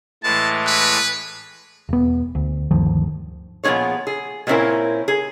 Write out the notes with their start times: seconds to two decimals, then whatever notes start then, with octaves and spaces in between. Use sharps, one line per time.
0.23 A2 E3 G#3 A5
0.67 B4
1.89 E1 B3
2.35 D2
2.71 G1 D2 D#3 F3
3.64 A#2 F3 B3 C#4 G#4 C#5
4.07 G#4
4.47 A#2 G3 C4 C#4 E4 A#4
5.08 G#4